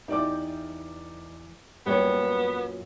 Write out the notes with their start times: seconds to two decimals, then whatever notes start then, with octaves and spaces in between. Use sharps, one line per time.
0.08 E2 D#4 G4 D5 D6
1.86 F#2 A#2 F#3 G3 B3 C#5